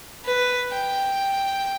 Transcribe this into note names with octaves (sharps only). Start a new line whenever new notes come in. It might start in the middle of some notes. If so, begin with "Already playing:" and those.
B4
G5